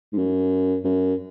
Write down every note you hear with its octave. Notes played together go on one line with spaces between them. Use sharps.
G#2
F#2
F#2